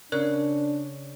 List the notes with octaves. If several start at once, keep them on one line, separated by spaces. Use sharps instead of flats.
C#3 D4 A#4 D5 F#6